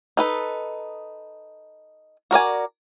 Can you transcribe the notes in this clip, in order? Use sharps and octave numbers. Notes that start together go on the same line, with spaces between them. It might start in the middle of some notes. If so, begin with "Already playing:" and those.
D#4 A4 B4
F#4 A#4 D5 G#5